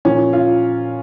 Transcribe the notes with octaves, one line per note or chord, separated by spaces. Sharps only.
A#2 F3 C#4
F4